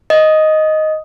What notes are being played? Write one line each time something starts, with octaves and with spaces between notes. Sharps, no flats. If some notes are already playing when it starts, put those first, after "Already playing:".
D#5